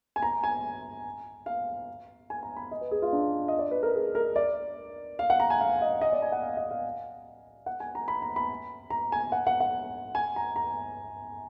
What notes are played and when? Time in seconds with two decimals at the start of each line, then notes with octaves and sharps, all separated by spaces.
0.16 G#5
0.22 A#5
0.43 G#5
1.46 F5
2.30 G#5
2.43 A#5
2.56 B5
2.71 D#5
2.81 B4
2.91 G#4
3.02 F4
3.13 D4
3.48 D#5
3.59 D5
3.71 B4
3.83 A#4
3.95 G#4
4.15 A#4
4.36 D5
5.19 F5
5.30 F#5
5.40 A#5
5.50 G#5
5.61 F5
5.82 D#5
6.01 D#5
6.12 D5
6.22 G#5
6.32 F#5
6.42 F5
6.57 D#5
6.71 F5
7.66 F#5
7.80 G#5
7.95 A#5
8.08 B5
8.22 A#5
8.36 B5
8.90 A#5
9.12 G#5
9.32 F#5
9.47 F#5
9.60 F#5
10.15 G#5
10.36 A#5
10.56 A#5